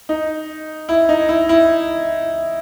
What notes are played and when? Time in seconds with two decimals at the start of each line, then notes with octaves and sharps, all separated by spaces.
0.09 D#4
0.89 E4
1.09 D#4
1.29 E4
1.49 E4